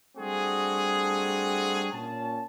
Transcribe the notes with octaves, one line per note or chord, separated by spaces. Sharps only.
G3 A3 C4 D4 F#4 G#4
A#2 C#4 A5